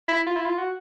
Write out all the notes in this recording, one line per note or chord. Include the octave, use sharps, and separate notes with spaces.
E4
F4
E4
F4
F#4